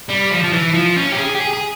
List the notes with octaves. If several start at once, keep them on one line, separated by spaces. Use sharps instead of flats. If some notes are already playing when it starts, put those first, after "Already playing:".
G3
F3
F3
E3
F3
C#4
G4
G#4
G4
G#4
G#4